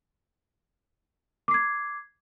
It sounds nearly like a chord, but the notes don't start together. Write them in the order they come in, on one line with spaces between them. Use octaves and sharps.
D6 C7 G#6